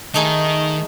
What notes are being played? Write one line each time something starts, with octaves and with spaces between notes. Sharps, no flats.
D#3 A3 D#4 G#4